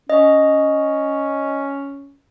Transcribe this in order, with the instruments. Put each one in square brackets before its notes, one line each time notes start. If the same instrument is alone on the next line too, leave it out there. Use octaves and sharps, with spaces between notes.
[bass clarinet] C#4 [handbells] D#5